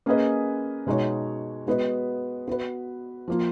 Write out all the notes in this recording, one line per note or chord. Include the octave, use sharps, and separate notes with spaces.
A#3 C#4 G#4 B4 D#5
B2 G#3 D#4 F#4 C#5
G#3 B3 F#4 B4 D#5
B3 F#4 B4
F3 A#3 F4